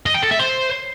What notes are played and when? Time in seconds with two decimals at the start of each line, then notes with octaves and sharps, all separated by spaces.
0.06 D#5
0.14 G5
0.23 A4
0.31 E5
0.39 C5